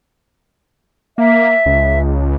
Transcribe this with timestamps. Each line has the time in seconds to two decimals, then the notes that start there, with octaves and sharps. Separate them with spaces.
1.18 A#3 E5
1.66 C#2